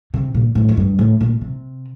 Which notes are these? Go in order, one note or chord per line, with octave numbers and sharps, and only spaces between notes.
C3
A#2
A2
F2
G2
A2
A#2
C3